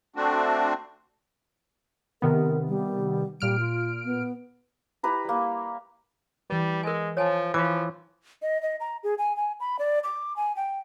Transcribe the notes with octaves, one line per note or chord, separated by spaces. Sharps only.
A3 C4 D4 F#4
C3 D#3 B3 A#4
G3
A#2 G3 F6 D7
F4
B3
E4 G4 B4 A#5
G3 A#3
E3 G3 B4
G#3 A#4 G#5
F3 C#5 G#5 A5
E3 F3 C#5 F5 D6
D#5
D#5
A#5
G#4
G#5
G#5
B5
D5
D6
G#5
G5